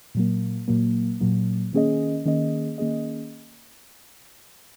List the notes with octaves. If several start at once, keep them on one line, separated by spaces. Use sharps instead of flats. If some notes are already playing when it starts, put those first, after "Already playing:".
A#2 F#3 A#3
A#2 F#3 A#3
A#2 F#3 A#3
D#3 A#3 C#4 G#4 D#5
D#3 A#3 C#4 G#4 D#5
D#3 A#3 C#4 G#4 D#5